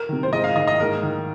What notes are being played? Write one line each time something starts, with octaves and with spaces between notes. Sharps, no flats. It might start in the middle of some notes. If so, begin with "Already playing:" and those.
Already playing: A#4
C3 D#3
C5
G#2 D#5
F5
D#3 D#5
D#5
G#2 A#4
D#3